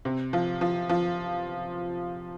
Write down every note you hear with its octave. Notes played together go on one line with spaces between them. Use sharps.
C3
F3
F3
F3